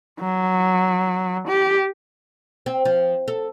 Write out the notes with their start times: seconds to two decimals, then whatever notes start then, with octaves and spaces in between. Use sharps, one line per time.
0.19 F#3
1.48 G4
2.66 C4
2.85 F3
3.28 A4